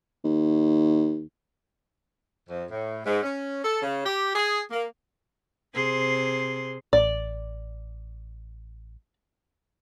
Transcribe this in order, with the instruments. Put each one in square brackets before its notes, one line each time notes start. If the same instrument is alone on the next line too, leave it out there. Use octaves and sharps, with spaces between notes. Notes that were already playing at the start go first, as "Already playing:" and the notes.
[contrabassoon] D#2
[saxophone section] F2
A2
G#2
C#4
A4
C#3
G4
G#4
A#3
[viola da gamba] C3 G#4 C5
[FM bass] A1 [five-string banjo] D5